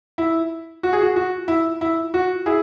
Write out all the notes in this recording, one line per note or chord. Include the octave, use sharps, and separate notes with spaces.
E4
F#4
G#4
F#4
F#4
E4
E4
F#4
E4 G#4